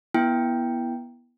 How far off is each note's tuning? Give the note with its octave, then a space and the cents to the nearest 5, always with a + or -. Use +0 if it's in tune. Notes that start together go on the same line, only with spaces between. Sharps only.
B3 -25 E4 +0 G5 +0